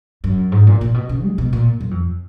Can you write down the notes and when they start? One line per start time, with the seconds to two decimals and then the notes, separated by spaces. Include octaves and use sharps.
0.24 F#2
0.52 G#2
0.67 A#2
0.81 A#2
0.94 B2
1.09 C#3
1.23 G#3
1.38 B2
1.53 A#2
1.80 F#2
1.91 F2